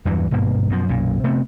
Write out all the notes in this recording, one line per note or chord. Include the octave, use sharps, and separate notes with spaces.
E2 G2 E3 F#3
G#1 G2 B2 A#3
F#2 B2 F3
B1 F#2 A#2
C3 A3 B3 C4